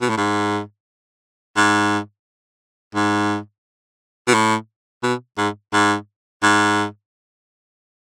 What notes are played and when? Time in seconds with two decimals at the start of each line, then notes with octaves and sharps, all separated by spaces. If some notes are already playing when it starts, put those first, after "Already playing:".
0.02 B2
0.09 A2
0.17 G#2
1.57 G#2
2.95 G#2
4.28 B2
4.34 A2
5.03 B2
5.38 G#2
5.73 G#2
6.43 G#2